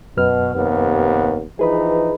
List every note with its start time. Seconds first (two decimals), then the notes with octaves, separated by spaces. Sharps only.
0.17 F#2 B2 B4 F6
0.55 D#2 C3 B3
1.59 E3 F3 D#4 G#4 B4 B5